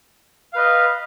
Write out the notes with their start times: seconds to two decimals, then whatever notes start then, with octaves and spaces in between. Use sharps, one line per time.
0.53 F5
0.55 B4
0.58 D#5